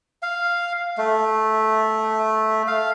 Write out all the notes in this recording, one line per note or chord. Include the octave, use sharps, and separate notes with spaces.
F5
A3
F5